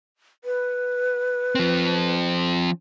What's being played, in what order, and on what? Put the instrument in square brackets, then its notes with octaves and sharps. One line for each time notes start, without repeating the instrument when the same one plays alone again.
[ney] B4
[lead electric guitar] F3 C4